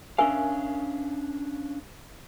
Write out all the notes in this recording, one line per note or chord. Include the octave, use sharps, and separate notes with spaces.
C#4 D4 A#4 E5 F5 G#5